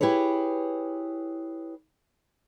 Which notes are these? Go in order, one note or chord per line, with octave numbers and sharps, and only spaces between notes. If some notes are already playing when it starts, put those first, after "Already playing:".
E4 G4 G#4 B4 C#5